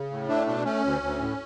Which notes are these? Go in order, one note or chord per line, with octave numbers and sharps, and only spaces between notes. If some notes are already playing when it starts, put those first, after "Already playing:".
Already playing: C#3
A2
A3 D4
B2 D4
A3 C#4
D2
D2
A2